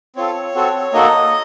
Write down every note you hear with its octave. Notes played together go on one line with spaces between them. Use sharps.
C4 F4 A4 C#5
C4 F#4 A4
A#3 D#4 F#4 A4 D#5